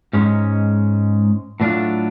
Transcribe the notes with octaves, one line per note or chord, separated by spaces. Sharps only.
G#2 G#3 C#4
A2 F#3 A3 D4 F4